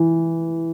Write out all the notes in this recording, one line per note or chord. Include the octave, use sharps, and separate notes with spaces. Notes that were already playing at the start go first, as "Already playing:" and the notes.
Already playing: E3